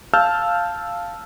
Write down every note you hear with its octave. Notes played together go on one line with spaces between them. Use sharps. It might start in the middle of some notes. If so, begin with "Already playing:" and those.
F5 A5 E6 F6 G6